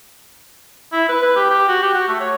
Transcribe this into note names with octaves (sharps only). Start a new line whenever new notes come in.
E4
B4
B4
G4
G4
F#4
G4
F#4
A3
C#5